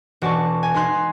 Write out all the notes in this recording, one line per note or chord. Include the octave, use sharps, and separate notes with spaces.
E1 F#4 D5 A5 C#6
G#5
G#3 D#4 C6 F#6 G#6